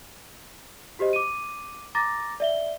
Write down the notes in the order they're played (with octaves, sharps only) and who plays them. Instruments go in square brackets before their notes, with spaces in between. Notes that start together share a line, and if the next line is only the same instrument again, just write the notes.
[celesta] F#4 G4 C5 D#5
D6 D#7
A#5 D6 A6 A#6
D5 E5 G7